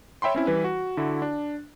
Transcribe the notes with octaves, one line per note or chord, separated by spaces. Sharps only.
C#5 E5 G5 B5 C6
C4 C#4 E4
E3 G3 B4
F#4
D3 E4 F#4
D4